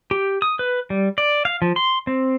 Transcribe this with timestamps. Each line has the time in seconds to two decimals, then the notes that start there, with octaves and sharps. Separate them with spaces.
0.11 G4
0.42 D#6
0.59 B4
0.90 G3
1.18 D5
1.45 F5
1.62 F3
1.76 C6
2.07 C4